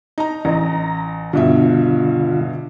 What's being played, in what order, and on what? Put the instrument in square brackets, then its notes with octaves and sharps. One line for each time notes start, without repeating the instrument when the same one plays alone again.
[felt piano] D#4 A#5
[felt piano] A1 D#5 [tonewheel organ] A#5
[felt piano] G2 B2 E5 [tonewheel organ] D3 F4